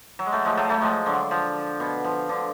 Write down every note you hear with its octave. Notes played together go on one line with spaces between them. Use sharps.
F#3
G#3
F#3 A3
F3 G#3
F#3 A3
F#3 A3
F3 G#3
D3 F#3
F3
B2
F3
D3